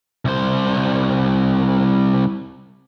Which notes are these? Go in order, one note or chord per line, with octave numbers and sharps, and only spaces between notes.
C2 C5